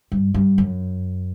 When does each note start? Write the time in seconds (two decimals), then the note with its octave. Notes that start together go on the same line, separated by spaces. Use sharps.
0.12 G2
0.34 G2
0.58 F#2